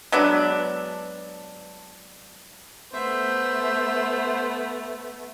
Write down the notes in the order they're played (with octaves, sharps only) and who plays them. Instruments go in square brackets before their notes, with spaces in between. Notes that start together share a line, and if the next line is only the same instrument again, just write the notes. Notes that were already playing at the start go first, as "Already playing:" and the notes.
[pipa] F#3 G#3 B3 D4
[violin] A3 B3 [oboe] C5 [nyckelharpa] E5